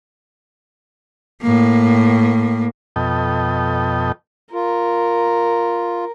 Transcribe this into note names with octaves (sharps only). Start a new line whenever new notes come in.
A2 A#3
F2 B2 A4 D#5 G5
F4 A#4